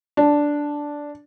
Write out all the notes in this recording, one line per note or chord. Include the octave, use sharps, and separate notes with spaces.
D4